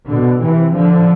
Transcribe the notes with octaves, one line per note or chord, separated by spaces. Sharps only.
B2 D3
C3 E3
D3 F3